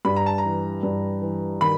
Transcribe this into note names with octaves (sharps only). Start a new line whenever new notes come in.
G2 B5
A#5
A5
A#5
E3
G2
E3
D#3 B5